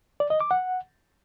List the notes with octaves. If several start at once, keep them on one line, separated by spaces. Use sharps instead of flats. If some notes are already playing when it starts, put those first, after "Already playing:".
D5
D#5
D6
F#5